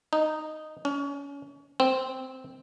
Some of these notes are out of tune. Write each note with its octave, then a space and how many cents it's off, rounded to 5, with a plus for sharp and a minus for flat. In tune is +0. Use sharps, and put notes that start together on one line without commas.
D#4 -5
C#4 +30
C4 -5